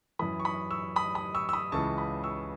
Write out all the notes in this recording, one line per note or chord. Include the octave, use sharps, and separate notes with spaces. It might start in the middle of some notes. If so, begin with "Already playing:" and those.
F#2 E3 B5 D#6
C#6
B5 D#6
C#6 E6
B5 D#6
B5 D#6
C#6 E6
E6
B5 D#6
C#2 C#3 E3 A5 C#6
B5 D#6
C#6 E6